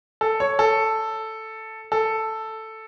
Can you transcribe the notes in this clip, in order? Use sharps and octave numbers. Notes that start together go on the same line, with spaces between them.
A4
C#5
A4
A4